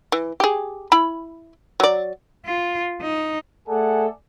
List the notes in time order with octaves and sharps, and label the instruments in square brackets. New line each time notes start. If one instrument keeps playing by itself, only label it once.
[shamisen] E3
G4 G#4
E4 B5
F#3 D5
[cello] F4
D#4
[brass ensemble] A3 G#4 A4 D5 F#5 G#5